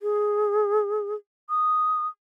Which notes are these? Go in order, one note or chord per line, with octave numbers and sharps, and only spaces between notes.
G#4
D#6